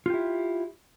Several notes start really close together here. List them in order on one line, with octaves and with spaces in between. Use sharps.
F4 G4 E4